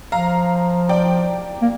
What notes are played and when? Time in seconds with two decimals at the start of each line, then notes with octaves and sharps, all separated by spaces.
0.12 F3 F5 A#5
0.89 D5 G5
1.62 A#3